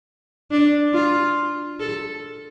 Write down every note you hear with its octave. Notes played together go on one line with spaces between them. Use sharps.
D4
F4
A4